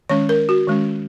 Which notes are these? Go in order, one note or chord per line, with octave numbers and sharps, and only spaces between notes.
D#3 G#3 C#4 C#5
A#4
F#4
D#3 G#3 C#4